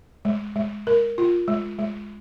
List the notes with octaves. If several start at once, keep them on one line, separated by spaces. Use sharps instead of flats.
G#3
G#3
A#4
F4
G#3
G#3